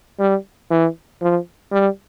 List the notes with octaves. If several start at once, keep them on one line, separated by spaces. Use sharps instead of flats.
G3
E3
F3
G3